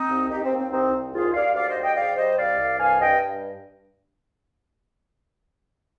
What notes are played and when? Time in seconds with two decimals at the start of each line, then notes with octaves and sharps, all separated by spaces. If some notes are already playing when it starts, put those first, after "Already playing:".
Already playing: C4 D#4
0.10 C2
0.30 D#2 D#4 G4
0.43 C4
0.51 D#2
0.58 C4
0.72 C2 C4 D#4
0.93 C2
1.13 D#2 F4 G#4
1.34 D#2 D5 F5
1.54 D2 D5 F5
1.69 C5 D#5
1.76 G3
1.82 D#5 G5
1.96 G#2 D5 F5
2.17 G3 C5 D#5
2.38 C2 D5 F5
2.58 C2
2.80 G2 F5 G#5
3.01 G2 D#5 G5